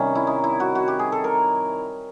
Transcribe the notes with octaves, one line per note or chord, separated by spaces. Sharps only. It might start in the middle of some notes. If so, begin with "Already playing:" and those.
Already playing: C3 D#3 G3 C#4
E4
D#4
E4
F#4
F#4
G4
G#4
A4
A#4